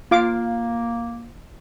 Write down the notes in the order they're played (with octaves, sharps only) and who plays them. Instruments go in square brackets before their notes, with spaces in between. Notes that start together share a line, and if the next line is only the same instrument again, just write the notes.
[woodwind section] A#3 [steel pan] F4 F5 D6